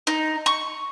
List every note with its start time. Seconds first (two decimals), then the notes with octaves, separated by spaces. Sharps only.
0.07 D#4
0.46 C#6